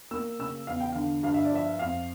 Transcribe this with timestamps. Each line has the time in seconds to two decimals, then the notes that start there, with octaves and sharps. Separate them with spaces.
0.11 A#3 E6
0.39 C#3 E6
0.67 E2 F5
0.80 G5
0.92 D3 F5
1.23 G2 F5
1.34 E5
1.45 D5
1.52 F3 E5
1.79 F2 F5